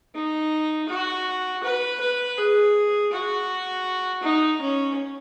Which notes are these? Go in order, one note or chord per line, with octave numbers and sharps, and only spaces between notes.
D#4
F#4
B4
B4
G#4
F#4
D#4
C#4